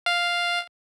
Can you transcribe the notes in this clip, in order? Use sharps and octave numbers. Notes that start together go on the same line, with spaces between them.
F5